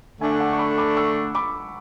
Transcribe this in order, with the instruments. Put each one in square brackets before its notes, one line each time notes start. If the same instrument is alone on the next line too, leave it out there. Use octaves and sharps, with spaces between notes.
[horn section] D3 A3 D4 [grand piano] E5 G#5
[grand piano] G#5
F#5 A5
C#6
B5 D6
B5 D6
C#6 E6
B5 D6